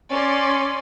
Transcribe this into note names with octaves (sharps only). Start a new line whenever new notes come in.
C#4 D5 C6